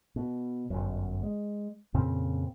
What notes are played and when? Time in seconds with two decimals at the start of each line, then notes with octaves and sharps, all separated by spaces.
0.16 B2
0.70 G1 F#2
1.23 G#3
1.94 F2 A#2 C#3 C4